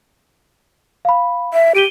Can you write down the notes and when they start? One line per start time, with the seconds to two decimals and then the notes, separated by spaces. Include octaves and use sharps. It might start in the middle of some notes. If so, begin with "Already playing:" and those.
1.05 F5 B5
1.53 E5
1.75 G4 D7 D#7 G7